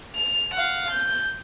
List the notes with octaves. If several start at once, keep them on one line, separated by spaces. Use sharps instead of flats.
F7
F5 F#5
G6